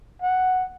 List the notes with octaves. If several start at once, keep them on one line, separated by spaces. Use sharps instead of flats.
F#5